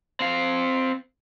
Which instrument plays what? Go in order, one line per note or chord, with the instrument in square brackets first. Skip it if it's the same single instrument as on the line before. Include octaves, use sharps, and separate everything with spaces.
[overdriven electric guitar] C4 F5